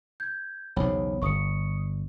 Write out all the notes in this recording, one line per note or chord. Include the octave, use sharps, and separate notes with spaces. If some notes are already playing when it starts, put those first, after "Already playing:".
G6 G#6
B1 E2 C#3 C5 C#5 B5
G1 C#6 D#6 C#7